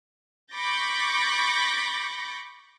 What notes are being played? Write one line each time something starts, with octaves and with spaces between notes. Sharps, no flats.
B5 C#6 D6 G6 A6 A#6